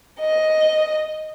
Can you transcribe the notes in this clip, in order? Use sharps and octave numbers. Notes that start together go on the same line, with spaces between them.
D#5